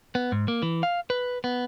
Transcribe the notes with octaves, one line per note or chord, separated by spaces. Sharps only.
B3
G#2
A#3
E3
F5
B4
B3